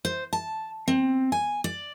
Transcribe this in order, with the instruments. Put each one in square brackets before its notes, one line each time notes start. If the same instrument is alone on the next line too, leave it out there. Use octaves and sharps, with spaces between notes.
[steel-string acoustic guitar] C5
A5
C4
G#5
D5